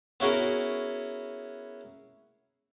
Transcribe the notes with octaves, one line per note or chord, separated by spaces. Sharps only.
B3 C#4 E4 F#4 G#4 A#4